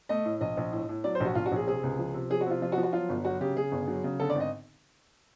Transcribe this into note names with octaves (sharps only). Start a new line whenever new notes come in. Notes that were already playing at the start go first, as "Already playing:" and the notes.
A3 D#5
A2
A#1 D#5
A#1
A2
A2
F#3 D5
C5
A#1
F#4
A#1 F4
F#4
A#1 G#4
C3 G#4
C#2
F3
C3
F3 G#4
F#4
C3 F4
F3 F4
F#4
F3
F#4
F#3 F4
G1
F#3 F#4
C#3 G4
C#3 G#4
G1
F#3
C#3
D3 A4
D5
G#1
D#5